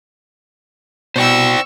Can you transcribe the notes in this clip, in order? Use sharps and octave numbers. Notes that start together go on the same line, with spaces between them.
B2 C5 D5 G5 C#6 E6